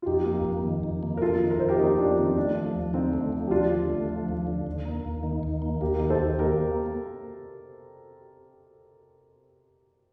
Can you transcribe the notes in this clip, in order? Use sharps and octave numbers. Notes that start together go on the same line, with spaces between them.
F4
F2 D#4 G4
A#3
F2
D#3
F2
A#3
A#4
F2 F4 A4
D#3
A#4
F2 C5
G4 A#4
A#3 D#4 G4
F2 D4 F4
D#3 C4 D#4
A3 D4
F3
D#2
D3 C4 D#4
A3
F3
G4
D#2 D4 F4
D3
A3
F3
D#2
D3
D#2
A#3
D#2
D#3
D#2
A#3
D#2 G4 A#4
D#3
A4 C5
D#2
A#3 G4 A#4